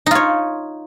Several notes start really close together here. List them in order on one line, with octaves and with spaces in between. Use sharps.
D#4 F4 C#5